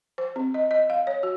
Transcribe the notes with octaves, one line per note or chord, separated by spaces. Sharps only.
C5
C4
D#5
D#5
F5
C#5
F#4